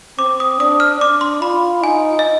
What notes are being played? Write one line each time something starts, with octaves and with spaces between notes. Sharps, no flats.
C4 D6
D#6
D4 D#6
F6
D4 D6
C6
F4 B5
D#4 G#5
D#5